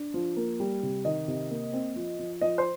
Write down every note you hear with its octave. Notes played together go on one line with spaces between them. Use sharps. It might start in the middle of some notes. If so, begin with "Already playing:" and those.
Already playing: D4
F3
A#3
G3
C3
D#3 D#5
C3
A#3
C4
F3
F3
F3 D#5
C5